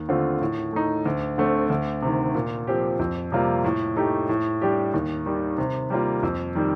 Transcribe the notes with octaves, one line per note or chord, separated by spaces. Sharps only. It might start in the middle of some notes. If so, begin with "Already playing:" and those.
Already playing: D#2
D3 A3 C4 F4
A2
A3 D#4
D2
D3 A3 C4
D2
C3 D#3
A#2
F3 C4 G4
F2
C3 G3 A#3 F4
A2
A3 D#4 G4
A2
G3 D4 G4
D#2
D#3 G3
C3
G3 A#3 F4
F2
D#3 G3